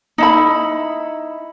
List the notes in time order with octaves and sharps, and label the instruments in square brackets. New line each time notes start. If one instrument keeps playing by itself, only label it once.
[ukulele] D#4 E4 B5